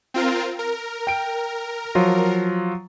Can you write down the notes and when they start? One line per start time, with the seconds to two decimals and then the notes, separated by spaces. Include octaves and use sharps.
0.14 C4 F4 A#4
0.59 A#4
1.07 G5 D7
1.95 F3 F#3 F4